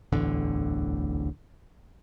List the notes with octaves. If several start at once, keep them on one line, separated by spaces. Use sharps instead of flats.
D1 A1 E2 D3